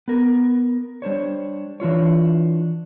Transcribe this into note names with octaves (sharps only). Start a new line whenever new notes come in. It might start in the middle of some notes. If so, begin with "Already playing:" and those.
B3 A#4
G3 D4 C5 C#5
E3 D4 F4 C#5